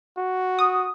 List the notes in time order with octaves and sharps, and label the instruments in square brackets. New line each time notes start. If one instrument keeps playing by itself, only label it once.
[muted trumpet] F#4
[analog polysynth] D#6